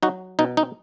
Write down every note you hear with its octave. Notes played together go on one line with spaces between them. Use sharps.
F#3 D#4 F#4
B2 D#4
D#4